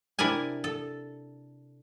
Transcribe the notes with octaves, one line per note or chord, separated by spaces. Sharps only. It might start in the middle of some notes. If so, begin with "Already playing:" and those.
C3 D4 E4 A#4 G#5
A4